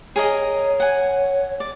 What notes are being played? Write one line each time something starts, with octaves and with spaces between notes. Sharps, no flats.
G#4 A#4 C#5 D#5
F#5 G#5
D5